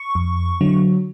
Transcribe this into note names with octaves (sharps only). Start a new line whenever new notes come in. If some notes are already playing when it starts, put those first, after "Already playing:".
Already playing: C#6
F2
D3 F#3